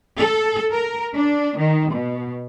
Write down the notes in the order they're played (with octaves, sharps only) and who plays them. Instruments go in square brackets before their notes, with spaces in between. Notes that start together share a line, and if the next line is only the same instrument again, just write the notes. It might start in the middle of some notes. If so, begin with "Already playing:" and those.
[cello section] A4
A#4
D4
D#3
B2